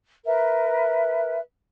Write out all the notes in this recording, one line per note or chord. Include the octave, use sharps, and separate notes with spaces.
A#4 B4 E5